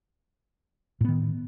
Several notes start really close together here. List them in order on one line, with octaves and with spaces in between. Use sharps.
A2 B3 D#3